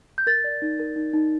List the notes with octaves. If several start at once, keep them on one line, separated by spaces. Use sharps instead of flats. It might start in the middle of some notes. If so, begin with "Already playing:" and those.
G6
A#4 A6
D5
D#4
A#4
D#4
D#4